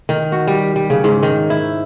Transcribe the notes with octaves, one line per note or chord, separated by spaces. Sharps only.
D#3
F#4
G3
G3
C#3
G#2
D#3
E4